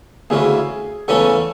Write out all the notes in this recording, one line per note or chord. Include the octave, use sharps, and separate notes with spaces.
D2 C#3 E3 G#4
E2 C#3 E3 A3 C#4 A4